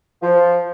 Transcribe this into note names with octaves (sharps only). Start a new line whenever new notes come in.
F3